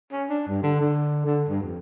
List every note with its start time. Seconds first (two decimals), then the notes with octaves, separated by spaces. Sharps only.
0.12 C#4
0.29 D4
0.47 G2
0.63 D3
0.81 D3
1.26 D3
1.48 G2
1.62 F2